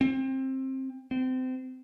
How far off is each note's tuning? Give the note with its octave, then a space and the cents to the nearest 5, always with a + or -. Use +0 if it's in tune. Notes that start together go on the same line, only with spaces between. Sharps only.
C4 +20
C4 -30